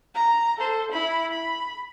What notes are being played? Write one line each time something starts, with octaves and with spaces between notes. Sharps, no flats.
A#5
A4 C5
E4 B5
B5